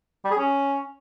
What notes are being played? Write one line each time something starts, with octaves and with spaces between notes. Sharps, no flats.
G3
G#4
C#4